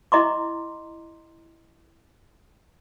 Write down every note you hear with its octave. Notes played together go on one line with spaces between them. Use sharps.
E4 D#5 A#5 C6 D6